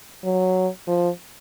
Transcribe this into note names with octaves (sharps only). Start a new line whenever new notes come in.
F#3
F3